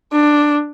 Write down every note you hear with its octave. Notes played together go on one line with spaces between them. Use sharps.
D4